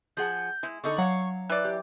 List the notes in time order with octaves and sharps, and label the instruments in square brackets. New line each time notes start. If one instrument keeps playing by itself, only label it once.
[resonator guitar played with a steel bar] F3 G#4 F#5 [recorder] G6
[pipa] G#3 [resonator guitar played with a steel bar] E4
[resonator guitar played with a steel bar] D3 D#4 A4 [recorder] C#6
[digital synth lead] F#3 [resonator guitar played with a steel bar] C#5 F5 F#5
[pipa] E3 D5 [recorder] F#6
[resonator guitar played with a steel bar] G4